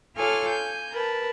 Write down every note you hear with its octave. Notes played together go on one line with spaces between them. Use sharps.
F4 A4 C#5 G#5 D6 F6
G#5 G6
A#4 B4 A5